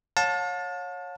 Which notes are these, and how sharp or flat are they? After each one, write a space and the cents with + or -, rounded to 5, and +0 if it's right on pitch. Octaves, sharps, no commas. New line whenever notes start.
C#5 -5 F5 +45 A5 +0